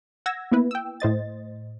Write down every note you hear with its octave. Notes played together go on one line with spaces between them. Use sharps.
F#5 E6 G#6 A#6
A#3 B3 E4 B4
G5 E6
A2 C5 D#5 A6